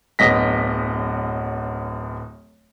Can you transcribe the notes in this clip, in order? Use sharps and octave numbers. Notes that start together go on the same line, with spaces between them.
D1 F#2 B3 D#5 A#6 B6